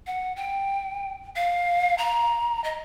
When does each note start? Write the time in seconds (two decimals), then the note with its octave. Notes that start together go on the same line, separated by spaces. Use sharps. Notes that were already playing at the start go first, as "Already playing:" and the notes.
0.07 F#5
0.36 G5
1.36 F5
1.98 A#5
2.64 D#5